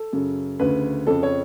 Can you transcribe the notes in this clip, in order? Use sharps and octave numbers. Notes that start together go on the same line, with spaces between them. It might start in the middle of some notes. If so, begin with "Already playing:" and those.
Already playing: A4
F#2 C#3
D2 C#3 B4
F2 C#3 A4
C#5